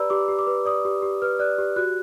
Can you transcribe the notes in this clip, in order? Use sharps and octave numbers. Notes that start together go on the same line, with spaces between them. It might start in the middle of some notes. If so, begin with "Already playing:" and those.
Already playing: G4 B4 D5 A#5 B5 E6
G4 D6
G4
D6
B4
D5 D#6
G4
G4
B4 F6
D5 F#6
G4
F#4 F#6